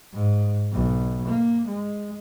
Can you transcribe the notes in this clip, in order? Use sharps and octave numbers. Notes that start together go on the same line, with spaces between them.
G#2
B1
A#3
G#3